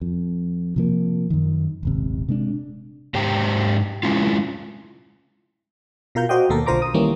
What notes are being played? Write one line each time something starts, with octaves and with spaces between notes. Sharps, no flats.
F2
C3 F3 A#3
F#2 D#3
D#1 G#1 C3
C3 G#3 B3 D4
G#2 G4 C5 G5 A#5
G#3 C#4 E4 F4
B2 F4 A#4 F5 G6
F#4 C5 D5 D#5 G5
D#2 B2 A#3 A4 A#4
B1 D3 F4 C5 A#5 D6
D#6
D#3 E3 G3 A#3 C#4